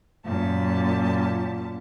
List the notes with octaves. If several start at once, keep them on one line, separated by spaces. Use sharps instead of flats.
F#2 A#2 A5